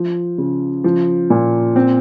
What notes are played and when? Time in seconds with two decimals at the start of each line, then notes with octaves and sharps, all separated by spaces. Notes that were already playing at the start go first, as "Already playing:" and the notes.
Already playing: F3
0.38 C#3
0.84 F3
1.30 A#2
1.76 C4